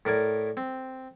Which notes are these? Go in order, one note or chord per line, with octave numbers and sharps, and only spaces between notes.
A2 A#4 D5 G#5
C4